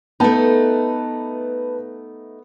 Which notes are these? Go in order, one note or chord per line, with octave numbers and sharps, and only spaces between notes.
A3 B3 D#4 B4 A5